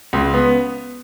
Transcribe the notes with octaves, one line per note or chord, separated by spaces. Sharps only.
C#2
B3